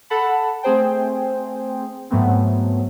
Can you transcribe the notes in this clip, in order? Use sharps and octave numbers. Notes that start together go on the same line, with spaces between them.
A4 F#5 A5 B5
A3 C4 G#4 C5 G5
G#2 F#3 A3 B3 C4